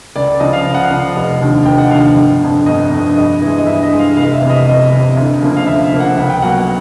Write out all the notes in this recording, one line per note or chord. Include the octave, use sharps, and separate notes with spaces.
C#2 D5
D5
C#3 F3 D#5
F5
C#2 F5
F#5
F5
C#3 F3
F1
D#2 D3 F3
F1 G5
F#5
D#2 D3 F3 F5
G1
F2 D3
G1 D#5
F2 D3
G2 D#5
E3 G#3
D#5
G2 E5
D#5
E3 G#3
F5
F1 F5
E5
E2 C3 E3
D#5
F1 D#5
E2 C3 E3
D2
C#3 F3 A#3
F5
D2 E5
F5
C#3 F3 A#3
F#5
C#2 F#5
G5
B2 F#3 A#3 F#5